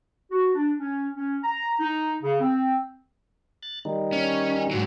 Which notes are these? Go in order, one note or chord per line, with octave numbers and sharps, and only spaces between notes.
F#4
D4
C#4
C#4
A#5
D#4
C#3
C4
F#6 A6
D#3 G3 D#4
C#4
G#2 F#3